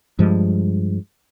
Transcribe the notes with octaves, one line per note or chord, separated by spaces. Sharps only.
G2 F3 G#3